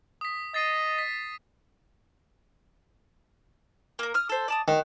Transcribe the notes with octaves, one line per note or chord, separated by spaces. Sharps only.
D#6 B6
D#5 A6 C7 D#7
B6
A#3 A#4
D#6 F6
A4 C5
D5 A5 D#6
D#3 F#4